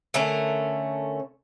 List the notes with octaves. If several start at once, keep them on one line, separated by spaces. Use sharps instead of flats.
D3 A3 C#4 A#4